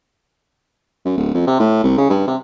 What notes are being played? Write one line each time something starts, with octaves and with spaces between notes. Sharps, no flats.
F#2
D1
F2
C3
A2
C2
C#3
G2
C3